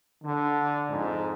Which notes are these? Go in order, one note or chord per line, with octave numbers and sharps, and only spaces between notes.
D3
F2 G#2